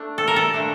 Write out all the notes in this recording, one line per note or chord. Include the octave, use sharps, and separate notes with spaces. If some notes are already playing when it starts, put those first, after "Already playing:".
Already playing: A3 D4
A4
A#4
A4
A#2 A3 D4